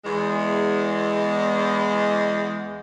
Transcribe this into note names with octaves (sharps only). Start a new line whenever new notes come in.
E2 G#3